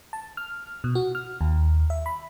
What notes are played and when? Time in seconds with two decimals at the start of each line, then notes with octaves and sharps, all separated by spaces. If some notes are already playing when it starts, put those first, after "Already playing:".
0.13 A5
0.37 F6
0.84 B2
0.95 F#4
1.15 F6
1.41 D#2
1.90 E5
2.06 B5